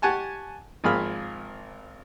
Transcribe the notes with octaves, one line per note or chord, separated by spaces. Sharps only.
G4 F#5 G#5 A5 C#6
G#1 F3 A#3 G#4 B5 F6